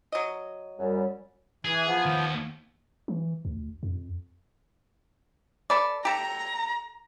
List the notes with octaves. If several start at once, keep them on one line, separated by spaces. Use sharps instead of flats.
F#3 D#5
F#2 G3
E3 G#4
F3 B3
D#2
E3
D2
F2
A4 B4 D5
G4 A4 A#5